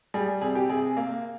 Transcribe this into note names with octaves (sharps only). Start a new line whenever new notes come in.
G3 G#4
C3 G#4
G4
C3 G#4
A#3